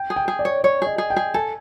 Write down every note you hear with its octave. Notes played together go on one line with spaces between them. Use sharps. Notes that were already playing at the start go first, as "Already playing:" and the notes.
Already playing: G5
G#4
G5
G#4
D5
C#5
C#5 D5
G#4 D#5
G#4
G5
G#4
A4 G#5